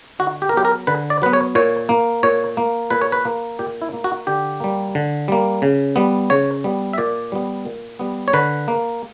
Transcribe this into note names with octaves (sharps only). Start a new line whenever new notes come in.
D3 F#4
G4
A#4
F#3 B3 G4
A#4
D3 B4
D5
F#3 B3 B4
C#5
A#2 C#5
A#3
A#2 C#5
A#3
A#2 B4
C#5
B4
A#3
A#2 G4
E4
A#3
F#4
D3 G4
G3 A#3
D3
G3 A#3
C#3
G3 B3
C#3 C#5
G3 B3
E5
A#2 D5
G3 B3
A#2
G3 B3
C#5
D3 B4
A#3